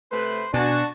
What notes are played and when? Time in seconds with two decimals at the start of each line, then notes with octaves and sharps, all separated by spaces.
0.11 C3 A3 B4 C5
0.54 B2 D4 F#4 G#5 A5